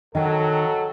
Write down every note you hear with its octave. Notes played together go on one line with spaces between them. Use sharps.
D#3 F#3 A4 D#5 G5